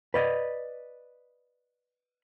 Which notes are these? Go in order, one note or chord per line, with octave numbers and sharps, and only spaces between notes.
B4 D5 D#5